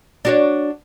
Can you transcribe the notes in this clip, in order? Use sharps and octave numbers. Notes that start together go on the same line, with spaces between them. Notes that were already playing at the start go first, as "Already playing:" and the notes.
D4 F#4 C#5